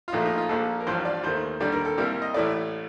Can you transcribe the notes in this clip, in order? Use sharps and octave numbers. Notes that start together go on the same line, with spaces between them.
F4
A#1 A#2 F3 A3 D#4
D#4
F4
A#1 A#2 F3 A4
A#4
A1 G2 F3 C5
D5
D#2 D#3 A3 C5
D#2 D3 G3 D5
A#4
A4
C2 C3 G3 A#3
D#5
A1 A2 A3 D5